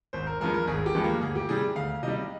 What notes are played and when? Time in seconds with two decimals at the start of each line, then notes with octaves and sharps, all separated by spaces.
0.13 G#1 C5
0.27 A#4
0.40 G2 F3 G#3 A#4
0.54 A#4
0.67 G#1 G#4
0.86 G4
0.95 G2 F3 G#3
1.04 A#3
1.21 D2 G#4
1.35 G4
1.49 C3 G3 G#4
1.76 D2 F5
2.03 C3 G3 D#5